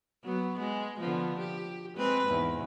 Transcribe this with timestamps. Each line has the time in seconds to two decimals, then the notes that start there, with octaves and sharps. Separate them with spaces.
0.24 F#3 B3
0.59 G#3
0.98 D3 F3 B3
1.39 G4
1.97 G#3 C4 B4
2.26 E2 G#2